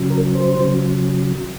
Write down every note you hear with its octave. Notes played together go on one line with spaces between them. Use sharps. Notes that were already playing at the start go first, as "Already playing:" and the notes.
Already playing: C#3 F#3
A#4
C5
C#3 F#3